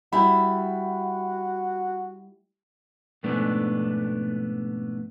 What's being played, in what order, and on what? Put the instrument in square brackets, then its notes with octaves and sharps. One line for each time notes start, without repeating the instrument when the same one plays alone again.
[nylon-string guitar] G3 E4 [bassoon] F#4 [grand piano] B5
[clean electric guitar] F2 G#2 B2 A3 B3 D4